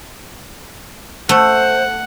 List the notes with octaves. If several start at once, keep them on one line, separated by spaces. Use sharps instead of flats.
A3 C5 F#5